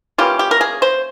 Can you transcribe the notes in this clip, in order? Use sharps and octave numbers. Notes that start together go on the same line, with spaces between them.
E3 A#3 C#4 F4 G4
G4
A#4
G#4
C5